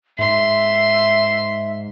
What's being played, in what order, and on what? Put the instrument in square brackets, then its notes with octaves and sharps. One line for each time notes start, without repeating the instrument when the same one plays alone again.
[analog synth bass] G#2 [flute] E5 [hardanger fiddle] C6